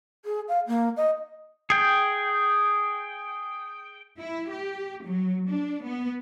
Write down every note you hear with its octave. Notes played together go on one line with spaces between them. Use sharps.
G#4
F5
A#3
D#5
G#4 G5
E4
G4
F#3
D4
B3